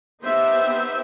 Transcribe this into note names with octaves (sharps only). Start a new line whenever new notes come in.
B3 D#4 G4 C5 E5